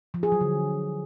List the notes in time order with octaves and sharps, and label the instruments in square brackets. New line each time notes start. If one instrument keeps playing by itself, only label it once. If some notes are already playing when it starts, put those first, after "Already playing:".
[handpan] F3
G#4
F#3
D3